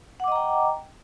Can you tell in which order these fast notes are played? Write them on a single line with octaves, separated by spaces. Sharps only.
F#5 D6 D#5 A#5 G5